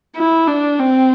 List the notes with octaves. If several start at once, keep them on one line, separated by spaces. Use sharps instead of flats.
E4
D4
C4